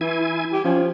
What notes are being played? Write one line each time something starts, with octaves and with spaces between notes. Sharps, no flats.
E3 E4 G#5
G4
F3 C#4